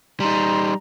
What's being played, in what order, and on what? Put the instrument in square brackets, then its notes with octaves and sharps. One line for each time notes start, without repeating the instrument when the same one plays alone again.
[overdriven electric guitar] G3 D#4 [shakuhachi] A#5 [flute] C6